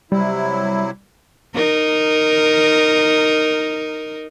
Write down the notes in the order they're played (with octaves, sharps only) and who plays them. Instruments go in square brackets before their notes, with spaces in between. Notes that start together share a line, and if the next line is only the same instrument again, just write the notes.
[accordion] C3 F#3 E4 [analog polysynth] G3
[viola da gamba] D#4 A#4